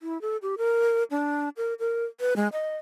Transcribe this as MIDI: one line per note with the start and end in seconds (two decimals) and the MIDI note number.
0.01 0.20 64
0.21 0.37 69
0.42 0.55 67
0.58 1.04 70
1.11 1.49 62
1.57 1.74 70
1.79 2.04 70
2.20 2.34 71
2.36 2.48 56
2.53 2.77 75